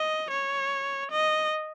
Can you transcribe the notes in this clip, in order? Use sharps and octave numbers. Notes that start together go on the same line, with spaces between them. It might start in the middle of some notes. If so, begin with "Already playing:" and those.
Already playing: D#5
C#5
D#5